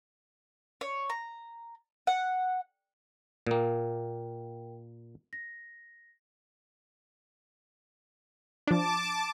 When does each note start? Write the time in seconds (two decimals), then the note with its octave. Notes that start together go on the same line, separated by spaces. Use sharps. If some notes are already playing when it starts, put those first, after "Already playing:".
0.81 C#5
1.10 A#5
2.07 F#5
3.47 A#2 A#3 A#4 G5
5.33 A#6
8.67 F3 D4 A5 D6